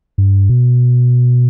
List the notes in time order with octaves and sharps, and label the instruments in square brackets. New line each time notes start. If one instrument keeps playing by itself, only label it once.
[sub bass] G2
B2